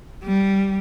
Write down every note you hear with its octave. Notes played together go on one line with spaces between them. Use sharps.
G3